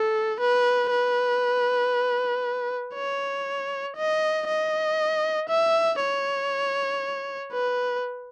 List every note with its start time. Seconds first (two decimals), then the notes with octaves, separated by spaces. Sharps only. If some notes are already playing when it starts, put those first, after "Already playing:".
Already playing: A4
0.40 B4
0.91 B4
2.94 C#5
3.97 D#5
4.48 D#5
5.49 E5
6.01 C#5
7.53 B4